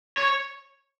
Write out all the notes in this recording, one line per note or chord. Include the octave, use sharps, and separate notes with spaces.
C#5